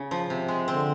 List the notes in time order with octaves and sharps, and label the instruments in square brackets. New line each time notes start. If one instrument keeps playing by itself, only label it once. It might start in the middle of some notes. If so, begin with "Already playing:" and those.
Already playing: [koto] C#3
F3
C3
G#3
[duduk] D3 [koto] C4